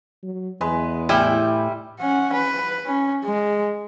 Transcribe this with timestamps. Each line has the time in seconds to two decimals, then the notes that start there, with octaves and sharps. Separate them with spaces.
0.23 F#3
0.61 E2 G#3 B4
1.09 A2 G3 E4 E5 G5 G#5
2.01 C#4 F#5
2.33 B4
2.86 C#4
3.24 G#3